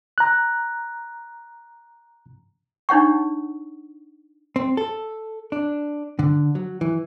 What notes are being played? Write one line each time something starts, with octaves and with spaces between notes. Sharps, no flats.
A#5 F#6
D4 D#4 C#5 F#5 C#6
C4
A4
D4
D3
F#3
E3